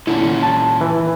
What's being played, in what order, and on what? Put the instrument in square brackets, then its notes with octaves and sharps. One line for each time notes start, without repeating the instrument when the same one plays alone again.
[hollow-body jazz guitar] E2 D3 E4 [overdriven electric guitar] A#2 C#4
[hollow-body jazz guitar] A5
[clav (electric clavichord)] E3